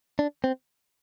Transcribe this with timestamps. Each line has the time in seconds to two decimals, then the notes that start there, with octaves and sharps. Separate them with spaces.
0.19 D4
0.44 C4